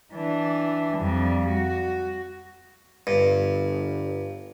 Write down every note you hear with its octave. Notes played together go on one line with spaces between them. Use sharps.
E3 D4
F2 G3
F#4
G1 G2